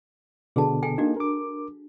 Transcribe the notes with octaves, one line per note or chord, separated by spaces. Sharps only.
B2 D3 B3 G#4 A5
A4 G5 G#5
A#3 D4 D#4 F#4
A#4 D6